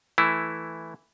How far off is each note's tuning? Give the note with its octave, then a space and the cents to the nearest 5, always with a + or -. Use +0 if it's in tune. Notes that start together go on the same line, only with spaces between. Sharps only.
E3 +0 A3 +0 E4 +0